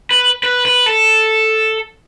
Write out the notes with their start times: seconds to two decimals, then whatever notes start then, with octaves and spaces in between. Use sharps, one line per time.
0.11 B4
0.43 B4
0.66 B4
0.86 A4